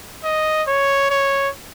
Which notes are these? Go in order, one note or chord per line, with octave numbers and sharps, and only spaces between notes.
D#5
C#5
C#5